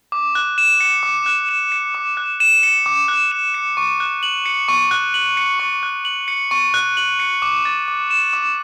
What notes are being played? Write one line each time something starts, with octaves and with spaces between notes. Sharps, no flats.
D6
F#6
E7
C#7
D6
F#6
E7
C#7
D6
F#6
E7
C#7
D6
F#6
E7
C#7
C#6
F#6
F#7
C#7
C#6
F#6
F#7
C#7
C#6
F#6
F#7
C#7
C#6
F#6
F#7
C#7
D6
A6
D6
E7
D6